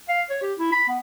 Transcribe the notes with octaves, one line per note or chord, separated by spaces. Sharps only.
F5
C#5
G4
E4
B5
B3